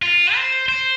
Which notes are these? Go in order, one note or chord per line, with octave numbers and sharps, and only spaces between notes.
F4
C5
C5